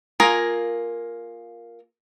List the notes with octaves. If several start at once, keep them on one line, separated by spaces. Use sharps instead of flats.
A#3 F4 G#4 A#4